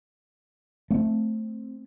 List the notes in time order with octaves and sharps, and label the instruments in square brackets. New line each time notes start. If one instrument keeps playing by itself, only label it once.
[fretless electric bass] A3 [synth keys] C4